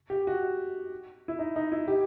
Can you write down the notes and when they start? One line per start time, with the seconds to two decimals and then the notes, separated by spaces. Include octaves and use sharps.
0.10 G4
0.27 F#4
1.28 E4
1.39 D#4
1.56 D#4
1.72 E4
1.88 G4